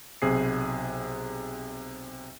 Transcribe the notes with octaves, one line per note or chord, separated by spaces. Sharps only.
B1 C3 G#4 C7